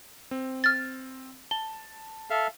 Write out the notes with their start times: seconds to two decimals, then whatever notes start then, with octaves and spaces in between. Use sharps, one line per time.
0.31 C4
0.64 F6 A6
1.51 A5 G7
2.30 A4 E5 F5